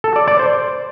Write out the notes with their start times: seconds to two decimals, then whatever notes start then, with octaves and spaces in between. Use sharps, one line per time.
0.04 A4
0.16 D5
0.28 D5
0.39 C5